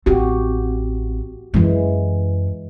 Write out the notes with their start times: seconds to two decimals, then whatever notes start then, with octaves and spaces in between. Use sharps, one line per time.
0.06 A1 C4 F#4 G4
1.54 F#2 E3 G#3